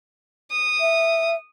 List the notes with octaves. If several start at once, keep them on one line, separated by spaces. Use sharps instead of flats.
D#6
E5